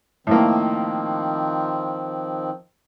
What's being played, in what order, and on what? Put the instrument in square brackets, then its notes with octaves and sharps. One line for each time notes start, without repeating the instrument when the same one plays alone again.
[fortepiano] A2 A#3 [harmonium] D#3 F3 C4